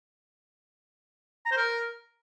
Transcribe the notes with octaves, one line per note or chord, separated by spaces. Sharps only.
A#5
C5
A#4